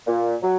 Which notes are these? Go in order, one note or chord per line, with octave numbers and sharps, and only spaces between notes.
A#2
F#3